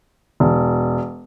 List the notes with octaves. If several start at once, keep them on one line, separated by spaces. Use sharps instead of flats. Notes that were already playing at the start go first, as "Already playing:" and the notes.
E1